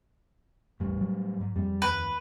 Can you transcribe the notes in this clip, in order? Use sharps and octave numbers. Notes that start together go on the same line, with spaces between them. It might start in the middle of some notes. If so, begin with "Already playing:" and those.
E1 A1 A2 G3
F#3
G#2
F2 G3 G#3
D#2 B4